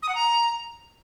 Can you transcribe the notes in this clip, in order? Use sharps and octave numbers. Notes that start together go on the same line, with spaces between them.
D#6
F#5
A#5